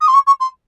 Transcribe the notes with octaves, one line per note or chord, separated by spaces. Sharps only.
D#6
C6
C#6
C#6
C6